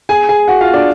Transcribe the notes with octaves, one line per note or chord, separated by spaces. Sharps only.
G#4 G#5
G#4 G#5
F#4 F#5
F4 F5
D4 D5